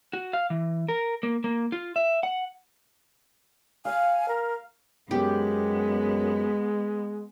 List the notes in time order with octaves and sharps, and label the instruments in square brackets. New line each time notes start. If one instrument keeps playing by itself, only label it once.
[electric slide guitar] F#4
F5
E3
A#4
A#3
A#3
F4
E5
F#5
[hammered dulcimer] F5 [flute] G#5
[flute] A#4
[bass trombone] F#2 [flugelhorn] G#3 [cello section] B3 [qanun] G4